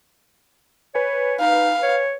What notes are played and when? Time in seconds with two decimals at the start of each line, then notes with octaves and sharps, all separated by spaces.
0.95 B4 C#5 G#5
1.40 D#4 F5
1.83 C#5